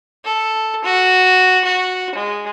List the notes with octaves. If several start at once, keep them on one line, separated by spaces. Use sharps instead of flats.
A4
F#4
F#4
G#3